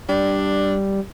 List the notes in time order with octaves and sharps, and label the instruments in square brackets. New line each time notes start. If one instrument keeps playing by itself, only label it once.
[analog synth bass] G3 [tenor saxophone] D4